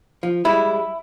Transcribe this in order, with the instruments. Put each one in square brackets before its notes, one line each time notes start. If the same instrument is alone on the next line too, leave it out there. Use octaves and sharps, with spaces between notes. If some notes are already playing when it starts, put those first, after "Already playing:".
[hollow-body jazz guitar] F3
[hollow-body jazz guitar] G3 G#3 [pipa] E4